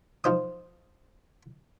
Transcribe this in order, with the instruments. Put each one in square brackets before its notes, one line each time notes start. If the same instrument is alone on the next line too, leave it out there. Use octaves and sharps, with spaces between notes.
[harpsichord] F3 D#4 C5 D#6